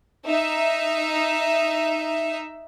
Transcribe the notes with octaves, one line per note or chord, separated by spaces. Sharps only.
D#4 E5